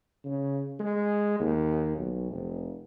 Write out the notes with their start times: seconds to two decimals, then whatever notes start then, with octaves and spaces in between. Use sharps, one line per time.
0.24 C#3
0.79 G#3
1.40 D#2
1.98 B1
2.31 F1